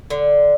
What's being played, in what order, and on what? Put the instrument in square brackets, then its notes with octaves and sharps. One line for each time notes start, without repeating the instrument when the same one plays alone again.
[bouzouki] D3